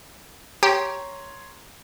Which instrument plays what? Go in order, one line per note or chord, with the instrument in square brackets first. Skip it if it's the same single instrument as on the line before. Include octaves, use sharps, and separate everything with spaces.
[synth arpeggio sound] G4 [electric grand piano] C#5 A#5 C6